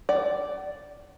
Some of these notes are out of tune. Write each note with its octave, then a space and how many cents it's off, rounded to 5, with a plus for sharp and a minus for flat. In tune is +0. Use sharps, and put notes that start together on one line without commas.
D5 +0 F#5 +40